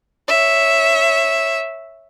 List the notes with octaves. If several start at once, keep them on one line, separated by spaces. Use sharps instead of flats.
C#5 E5